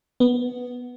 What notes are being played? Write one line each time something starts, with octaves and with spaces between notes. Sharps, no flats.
B3